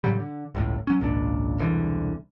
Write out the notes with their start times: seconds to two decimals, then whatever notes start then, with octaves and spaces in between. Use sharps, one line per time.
0.04 A2 C#3 F#3 G3
0.20 D3
0.55 G1 C#2 A2
0.87 F#3 C#4
1.00 G#1 C#2 A#2 D4
1.58 E1 C2 D3 E3